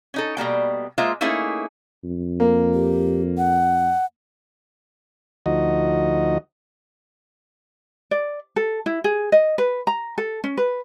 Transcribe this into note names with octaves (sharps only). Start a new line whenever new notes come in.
C#4 D#4 A4
B2 G3 A#3 G5
G#3 A#3 F4 C5 D#5 E5
A3 A#3 C#4 D#4 E4 G#4
F2
A#3
G4
F#5
D2 F3 D#4 F#4 D#5
D5
A4
E4
G#4
D#5
B4
A#5
A4
C#4
B4